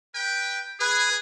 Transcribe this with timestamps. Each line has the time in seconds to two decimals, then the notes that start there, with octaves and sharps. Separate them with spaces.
0.15 B4 G5
0.80 G#4 B4